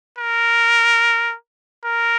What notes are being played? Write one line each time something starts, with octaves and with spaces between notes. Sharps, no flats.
A#4
A#4